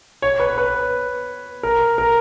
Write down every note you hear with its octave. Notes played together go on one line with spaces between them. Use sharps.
C#5
B4
B4
A#4
A#4